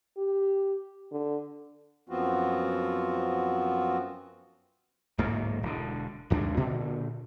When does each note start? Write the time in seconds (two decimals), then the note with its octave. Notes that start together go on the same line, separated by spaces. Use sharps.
0.17 G4
1.12 D3
2.09 F#2 F3 B3 C4 F4 F#4
5.18 D1 G#2 B2 A#3
5.63 E1 D3
6.30 F1 D#2 G#3 D4
6.57 A#2 D3